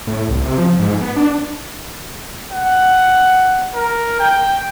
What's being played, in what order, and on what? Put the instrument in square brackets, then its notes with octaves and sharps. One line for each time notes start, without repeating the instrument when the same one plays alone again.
[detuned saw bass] A2
C2
C3
F3
G#2
B3
D4
[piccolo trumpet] F#5
A#4
G5